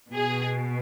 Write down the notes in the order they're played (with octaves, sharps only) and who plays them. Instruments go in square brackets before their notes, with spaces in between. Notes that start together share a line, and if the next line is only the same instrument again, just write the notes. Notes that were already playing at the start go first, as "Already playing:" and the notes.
[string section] B2 G#4